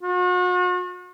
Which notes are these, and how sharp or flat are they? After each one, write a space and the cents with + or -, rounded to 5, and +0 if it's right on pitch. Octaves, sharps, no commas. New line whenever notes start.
F#4 -40